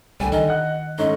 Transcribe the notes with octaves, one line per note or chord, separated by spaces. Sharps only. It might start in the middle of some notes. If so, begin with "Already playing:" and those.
C2 D3 G3 G#5
D#3 D#5
F#5 F#6
G#2 A3 C#4 D#5